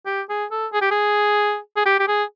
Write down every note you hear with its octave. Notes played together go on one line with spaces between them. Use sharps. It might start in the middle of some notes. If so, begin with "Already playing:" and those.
G4
G#4
A4
G#4
G4
G#4
G#4
G4
G4
G#4